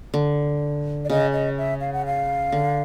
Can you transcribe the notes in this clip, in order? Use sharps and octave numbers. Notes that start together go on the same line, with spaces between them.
D3
D5
C#3 D#5
D#5
E5
F5
F#5
F5
D3